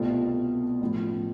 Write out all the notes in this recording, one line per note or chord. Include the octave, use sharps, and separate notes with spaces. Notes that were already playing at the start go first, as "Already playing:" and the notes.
Already playing: C2 B2 A3 C4 F4
A1 A2 F3